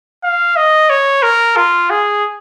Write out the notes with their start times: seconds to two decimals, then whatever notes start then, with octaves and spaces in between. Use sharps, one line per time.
0.24 F5
0.57 D#5
0.90 C#5
1.23 A#4
1.56 F4
1.90 G#4